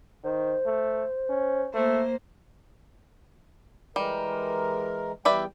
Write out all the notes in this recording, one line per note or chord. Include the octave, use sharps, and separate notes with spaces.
D#3 C5
A3
C#4
A3 A#3 C5
E3 G3 G#3 A#4
E2 G3 B4 D5 E5 G5